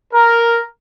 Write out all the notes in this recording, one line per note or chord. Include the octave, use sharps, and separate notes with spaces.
A#4